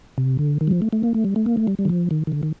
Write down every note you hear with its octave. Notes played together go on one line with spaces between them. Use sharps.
C3
D3
D#3
G3
F3
A3
A3
A#3
A3
G3
A3
A#3
A3
G3
G3
D#3
F3
D#3
D#3
D3
D#3